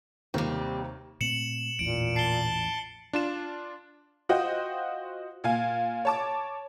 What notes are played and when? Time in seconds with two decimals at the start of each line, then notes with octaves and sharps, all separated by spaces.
0.34 D#2 C3 G3 A#3 C4
1.21 A#2 A3 C4 C#7 E7 F#7
1.79 A1 E2 A#2 E3 D7
2.16 A5 C7 G7
3.13 D4 F4 E7
4.29 F4 F#4 C5 D#5 G5
5.44 A#2 F5 G#5
6.05 C#5 A5 D6